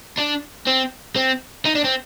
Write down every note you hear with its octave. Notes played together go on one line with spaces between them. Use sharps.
D4
C4
C4
D#4
D4
C4